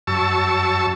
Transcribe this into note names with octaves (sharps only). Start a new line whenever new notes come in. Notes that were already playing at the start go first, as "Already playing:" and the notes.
F#2 A5 C#6 E6